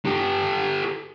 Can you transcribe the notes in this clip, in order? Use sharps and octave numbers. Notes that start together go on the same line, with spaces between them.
G4 A4